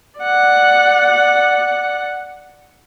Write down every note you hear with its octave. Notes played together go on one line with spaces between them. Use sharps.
D5 F#5